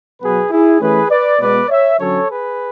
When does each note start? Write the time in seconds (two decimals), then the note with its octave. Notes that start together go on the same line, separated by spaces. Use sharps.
0.21 B2 F#3 B3 G#4 B4
0.51 E4 G#4
0.80 E3 A3 C#4 G#4 B4
1.10 B4 D5
1.40 B2 G#3 B3 B4 D5
1.69 C#5 E5
1.99 D3 F#3 C#4 A4 C#5
2.29 G#4 B4